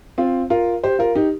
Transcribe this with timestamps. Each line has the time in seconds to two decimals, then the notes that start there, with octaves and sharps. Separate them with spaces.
0.18 C4 F4
0.50 F4 A#4
0.84 G4 C5
0.99 F4 A#4
1.15 D#4 G4